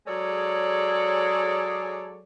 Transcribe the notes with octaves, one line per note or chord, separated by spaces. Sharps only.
F#3 G#3 G#4 A4 C#5 D5